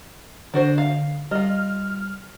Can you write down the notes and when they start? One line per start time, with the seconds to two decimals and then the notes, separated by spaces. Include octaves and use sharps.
0.54 D3 D4 F#4 C5
0.78 F5
1.31 G3 F4 D#5 F6